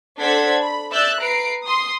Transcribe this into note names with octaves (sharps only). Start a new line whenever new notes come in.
D4 A4 C5 F#5 G#6 B6
B5
D5 E5 E6 F#6 G6 A6
B4 A#5 C7 D7
C6 D#6